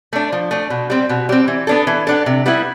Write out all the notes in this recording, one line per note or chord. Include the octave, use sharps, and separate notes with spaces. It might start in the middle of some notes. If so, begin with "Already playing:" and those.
A3 D4
F3
A3 D4
B2
G3 C4
B2
G3 C4
E3
B3 D4 A4
E3
B3 D4 A4
C3
G3 B3 E4